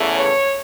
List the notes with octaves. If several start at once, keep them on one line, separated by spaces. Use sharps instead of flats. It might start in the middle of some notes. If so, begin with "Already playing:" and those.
Already playing: E2 C#3 E3 A3
C#5